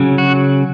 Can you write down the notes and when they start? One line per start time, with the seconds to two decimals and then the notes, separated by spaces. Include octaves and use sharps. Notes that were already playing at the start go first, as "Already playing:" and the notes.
Already playing: C#3 F#3 C#4
0.18 F#4